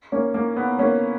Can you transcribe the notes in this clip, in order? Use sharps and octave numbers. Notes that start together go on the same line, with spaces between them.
A#3 C#4
A#3
B3
A#3 C#4